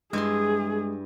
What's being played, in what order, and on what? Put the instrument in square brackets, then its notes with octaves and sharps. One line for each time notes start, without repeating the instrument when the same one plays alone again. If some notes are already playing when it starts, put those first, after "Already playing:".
[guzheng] G2 E4 C6 [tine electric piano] G#3 [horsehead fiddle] G#4